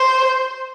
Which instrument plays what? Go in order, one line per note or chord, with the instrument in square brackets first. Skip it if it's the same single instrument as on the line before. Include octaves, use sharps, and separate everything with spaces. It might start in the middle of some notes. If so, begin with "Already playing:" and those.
Already playing: [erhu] C5